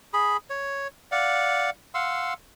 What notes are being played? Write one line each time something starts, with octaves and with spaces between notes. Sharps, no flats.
G#4 B5
C#5
D5 F5 F#5
F5 F#5 C6 E6